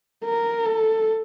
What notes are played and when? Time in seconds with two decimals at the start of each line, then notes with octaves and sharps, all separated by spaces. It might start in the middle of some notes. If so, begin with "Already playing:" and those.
0.25 A#4
0.66 A4